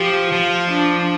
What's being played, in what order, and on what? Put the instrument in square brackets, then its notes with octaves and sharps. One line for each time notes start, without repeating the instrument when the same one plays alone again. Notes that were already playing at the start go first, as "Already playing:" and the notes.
Already playing: [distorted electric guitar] F3 [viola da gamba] G4
[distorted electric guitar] F3 [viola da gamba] F4
[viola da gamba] D4